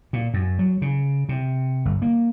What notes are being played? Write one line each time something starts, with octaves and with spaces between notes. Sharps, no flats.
A#2
F#2
F#3
C#3
C3
G1
A#3